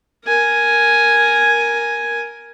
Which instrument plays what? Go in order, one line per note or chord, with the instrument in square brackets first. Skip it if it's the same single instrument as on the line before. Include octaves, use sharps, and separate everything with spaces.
[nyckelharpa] A#4 G#5